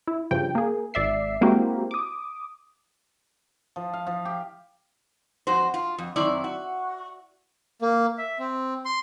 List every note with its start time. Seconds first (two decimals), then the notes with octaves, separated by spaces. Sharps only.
0.07 E4
0.31 G2 C#3 F3 G5
0.55 A#3 G#4
0.94 G#1 D5 E5 C7
1.41 G#3 A#3 C4 E4 F#4 G4
1.91 D6 D#6
3.76 F3
3.93 F5
4.07 F3
4.25 G4
5.47 F2 F#4 C5
5.74 F4
5.98 F2
6.16 F#2 D#3 C4 E4 D5
6.44 F#4
7.82 A#3
8.18 E5
8.39 C4
8.85 C6